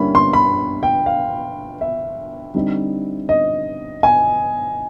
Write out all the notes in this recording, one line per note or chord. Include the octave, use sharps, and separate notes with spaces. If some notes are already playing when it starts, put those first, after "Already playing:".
Already playing: D3 G3 A#3 C#4 E4 B5
C6
B5
G5
F5
E5
D3 G3 C4 D#4
D#5
G#5